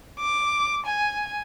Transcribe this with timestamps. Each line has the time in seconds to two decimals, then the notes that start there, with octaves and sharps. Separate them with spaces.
0.19 D6
0.86 G#5